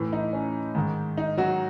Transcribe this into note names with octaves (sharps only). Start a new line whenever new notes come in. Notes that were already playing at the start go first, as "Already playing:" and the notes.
Already playing: A2 E3
D#4
C#4
G#2 D#3
D#4
F#3 F#4